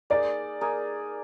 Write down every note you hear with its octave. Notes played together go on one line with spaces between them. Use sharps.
A#3 D#4 G#4 D5
A#3 D#4 G#4